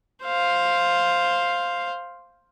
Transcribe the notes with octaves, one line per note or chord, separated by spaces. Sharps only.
C5 F5